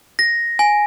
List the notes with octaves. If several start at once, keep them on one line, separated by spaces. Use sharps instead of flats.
A#6
G#5